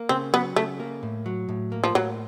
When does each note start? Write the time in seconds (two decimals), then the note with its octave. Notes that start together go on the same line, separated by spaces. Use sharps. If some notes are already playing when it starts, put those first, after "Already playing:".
Already playing: A#3
0.09 C#3 C4
0.33 F#3 B3
0.56 C#3 A3
0.80 A#3
1.03 A2
1.26 F#3
1.49 A2
1.72 A#3
1.84 F3
1.95 A2 F#3